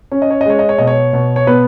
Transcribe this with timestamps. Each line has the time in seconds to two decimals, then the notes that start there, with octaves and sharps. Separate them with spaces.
0.12 C#4 C#5
0.22 D#5
0.31 C#5
0.41 D#5
0.46 G#3 C#5
0.59 D#5
0.69 C#5
0.78 B2 D#5
0.87 C#5
1.13 B2
1.36 C#5
1.47 B3 B4